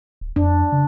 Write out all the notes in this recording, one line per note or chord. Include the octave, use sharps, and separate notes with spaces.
D1
F2 D4
C#3